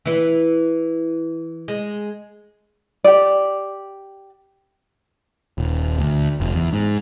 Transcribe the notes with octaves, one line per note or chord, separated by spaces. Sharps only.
E3 E4
G#3
G4 D5
D#1
D2
F1
E2
G#2